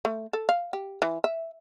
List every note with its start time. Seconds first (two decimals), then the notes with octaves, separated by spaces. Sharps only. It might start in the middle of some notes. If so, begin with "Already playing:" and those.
0.05 A3
0.33 A4
0.49 F5
0.73 G4
1.02 E3
1.24 E5